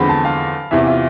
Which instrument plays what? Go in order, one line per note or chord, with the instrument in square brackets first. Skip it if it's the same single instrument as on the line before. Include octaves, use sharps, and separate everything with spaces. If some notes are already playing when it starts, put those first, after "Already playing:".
Already playing: [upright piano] E2 D3 F3 G#3 C4 [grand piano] B5
[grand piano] A5
F5
[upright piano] E2 C3 E3 [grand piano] E5
[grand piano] F4